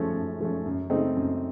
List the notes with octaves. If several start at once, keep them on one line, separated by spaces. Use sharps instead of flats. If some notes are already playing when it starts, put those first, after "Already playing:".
Already playing: F#2 F3 A3 C#4
F#2
F3 A3 C#4
F#2
C#3 A3 C4 D#4
F#2